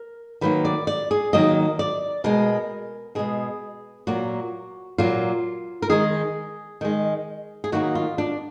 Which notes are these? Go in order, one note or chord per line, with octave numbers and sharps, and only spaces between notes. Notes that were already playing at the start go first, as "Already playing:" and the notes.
Already playing: A#4
D#3 F#3 A#3 B4
D5
D5
G#4
D#3 F#3 A#3 D#5
D5
B2 G#3 A#4
B2 G#3 G#4
A#2 F#3 A#3 F#4
A#2 F#3 A#3 F4
A#4
D#3 G#3 G#4
D#3 G#3
G#4
D#3 F#3 A#3 F#4
F4
D4